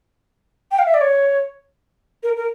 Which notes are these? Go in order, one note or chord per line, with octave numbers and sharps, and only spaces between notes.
G5
F5
E5
D5
C#5
A#4
A#4